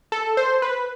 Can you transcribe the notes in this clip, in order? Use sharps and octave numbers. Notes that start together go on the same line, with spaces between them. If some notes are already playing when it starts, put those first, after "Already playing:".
A4
C5
B4